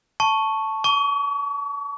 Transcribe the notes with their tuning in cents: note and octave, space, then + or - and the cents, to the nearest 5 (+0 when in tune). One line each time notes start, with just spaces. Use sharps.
A5 +0 C#6 +0
A5 +0 C#6 +40